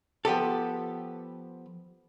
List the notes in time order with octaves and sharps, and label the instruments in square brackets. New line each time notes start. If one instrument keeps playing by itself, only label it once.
[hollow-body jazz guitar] F3 B3 G4 A4